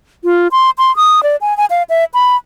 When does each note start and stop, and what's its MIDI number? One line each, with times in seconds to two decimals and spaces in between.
0.24 0.48 65
0.52 0.70 84
0.78 0.94 84
0.96 1.23 87
1.23 1.36 74
1.41 1.56 80
1.57 1.65 80
1.70 1.83 77
1.89 2.05 76
2.14 2.36 83